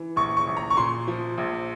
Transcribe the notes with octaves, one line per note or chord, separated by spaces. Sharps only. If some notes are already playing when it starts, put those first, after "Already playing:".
Already playing: E3
A#1 C#6
C#6
A#1
A#5
C#6
A#2 C6
F3
A#1